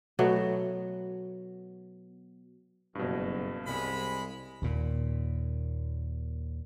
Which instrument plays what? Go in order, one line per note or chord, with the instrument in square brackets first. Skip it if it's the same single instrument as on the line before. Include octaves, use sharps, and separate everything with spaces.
[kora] B2 F#3 A3 B3
[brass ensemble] F#1 [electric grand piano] G2 B2
[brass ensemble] C2 [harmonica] G#3 B5
[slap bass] D#2 A#2